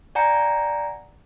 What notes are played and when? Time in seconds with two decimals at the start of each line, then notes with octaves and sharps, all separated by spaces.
0.15 D5 F#5 G#5 A#5 G6 C#7